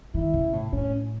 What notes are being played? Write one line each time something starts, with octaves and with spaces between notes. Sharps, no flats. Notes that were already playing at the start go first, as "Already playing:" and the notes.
D#3 E4
C#3
A2
A2 C#4